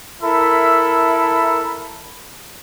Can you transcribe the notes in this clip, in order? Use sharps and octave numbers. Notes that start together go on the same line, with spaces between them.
E4 A4 A#4 E5 B5